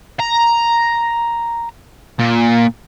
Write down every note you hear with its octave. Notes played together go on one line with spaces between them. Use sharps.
A#5
A#2